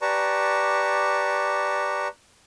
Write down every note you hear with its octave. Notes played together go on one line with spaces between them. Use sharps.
G4 B4 D5 A5 A#5 C#6